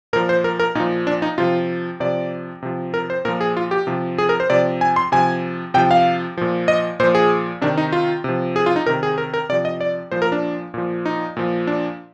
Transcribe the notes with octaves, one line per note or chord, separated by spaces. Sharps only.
A#2 F3 A#4
C5
A#4
A#4
A#2 F3 D#4
D4
D#4
C3 F3 F4
C3 F3 D5
C3 F3
A#4
C5
A#2 F3 A#4
G#4
F4
G4
C3 F3
G#4
A#4
C5
C3 F3 D5
G#5
C6
C3 F3 G#5
C3 F3 G5
F5
A#2 F3
D#5
A#2 F3 C5
G#4
C3 D#3 D4
D#4
F4
C3 F3
G#4
F4
D#4
C3 D#3 A#4
G#4
A#4
A#4
C3 F3 D5
D#5
D5
A#2 F3 C5
A#4
D4
A#2 F3
D#4
A#2 F3
D4